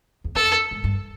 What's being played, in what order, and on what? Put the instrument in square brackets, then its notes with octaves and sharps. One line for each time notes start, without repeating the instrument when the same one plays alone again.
[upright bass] E2
[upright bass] F2 [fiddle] A4
[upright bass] G#2
G2